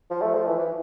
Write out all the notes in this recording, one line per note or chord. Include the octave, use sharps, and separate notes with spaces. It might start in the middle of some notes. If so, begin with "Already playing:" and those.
F3
A3
F3
E3
E3